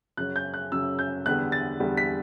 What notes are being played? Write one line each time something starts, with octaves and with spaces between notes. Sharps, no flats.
F#2 C#3 F#3 C#4 F#6
G6
F#6
F#2 C#3 F#3 C#4 E6
G6
E2 D3 G3 B3 F#6
A6
E2 D3 G3 B3
B6